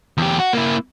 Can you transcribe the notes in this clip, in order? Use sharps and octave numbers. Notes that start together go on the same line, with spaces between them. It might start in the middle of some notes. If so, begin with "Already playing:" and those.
E2 G4
F#4
A#3 E4